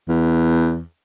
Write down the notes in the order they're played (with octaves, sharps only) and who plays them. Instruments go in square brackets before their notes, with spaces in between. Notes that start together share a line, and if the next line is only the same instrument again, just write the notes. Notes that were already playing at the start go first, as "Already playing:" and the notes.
[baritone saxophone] E2